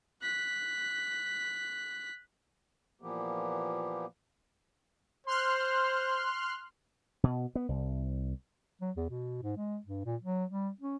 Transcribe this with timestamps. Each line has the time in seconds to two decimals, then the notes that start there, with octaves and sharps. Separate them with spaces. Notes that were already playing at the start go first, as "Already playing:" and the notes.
0.22 F#6 B6
3.01 A#2 E3 F3 A#3 B3 G4
5.27 C5 C6 F6 F#6
7.24 B2
7.55 B3
7.69 C2
8.81 F#3
8.96 E2
9.10 B2
9.42 G#2
9.57 G#3
9.86 G2
10.05 A#2
10.22 F#3
10.51 G3
10.81 C#4